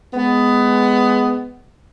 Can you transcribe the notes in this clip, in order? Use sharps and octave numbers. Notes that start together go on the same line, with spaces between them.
G#3 B3